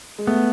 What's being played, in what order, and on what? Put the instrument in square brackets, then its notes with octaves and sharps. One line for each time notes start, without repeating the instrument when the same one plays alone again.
[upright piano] G#3
[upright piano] A3 [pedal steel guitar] B3